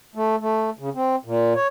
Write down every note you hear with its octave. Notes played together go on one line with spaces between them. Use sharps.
A3
A3
C#3
C4
A#2
C#5